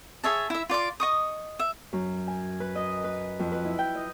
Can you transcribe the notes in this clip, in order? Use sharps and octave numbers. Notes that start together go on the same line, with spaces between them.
G#4 C#5 E5 A5
E4 E5
F4 D5 C6 D6
D#5 C#6 D#6
E5
F#2
G#5
B4
D#5
B4
F2
B4
E4
G5
D#5